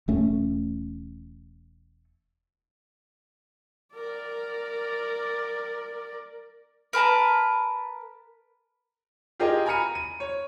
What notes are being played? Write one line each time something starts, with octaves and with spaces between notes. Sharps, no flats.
E1 A3 C#4
A#4 D5
A#4 B4 A5 A#5
F4 G4 G#4 A#4 D#5
G#5 A#5 B5 F6 C#7 D#7
D#7
C#5